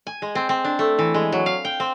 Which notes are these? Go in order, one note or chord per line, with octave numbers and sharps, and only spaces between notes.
G#5
G#3
C4
C4
D4
A3
E3
G#3
F#3
F5
G5
C4